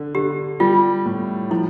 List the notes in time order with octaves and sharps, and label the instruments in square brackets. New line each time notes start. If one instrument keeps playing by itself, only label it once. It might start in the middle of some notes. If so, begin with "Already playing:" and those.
Already playing: [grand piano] D3
[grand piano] D3 [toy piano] G4
[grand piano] G3 [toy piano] F4
[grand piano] A2
[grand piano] F3 [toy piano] E4